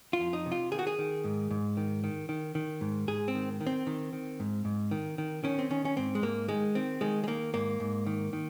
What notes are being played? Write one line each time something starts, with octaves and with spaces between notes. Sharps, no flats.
F4
F2
D#4
C3
F4
D#3 G#4
F#4
G#4
D#3
G#2
G#2
D#3
D#3
D#3
D#3
G#2
G#2 G#4
C4
D#3
D#3
C4
D#3
D#3
G#2
G#2
D#3
D#3
D#3 C#4
C4
D#3 C#4
C#4
G#2 C4
G#3
G#2 A#3
D#3 G#3
D#3 C4
D#3 G#3
G#3
D#3 A#3
G#2 A#3
G#2
D#3
D#3